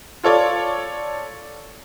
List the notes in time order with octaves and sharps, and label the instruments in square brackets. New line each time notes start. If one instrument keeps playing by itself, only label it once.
[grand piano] F4 A4 C#5 D5